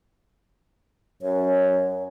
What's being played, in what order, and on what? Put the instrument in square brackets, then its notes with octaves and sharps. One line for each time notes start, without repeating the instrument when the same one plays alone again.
[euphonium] F#2 [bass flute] C#5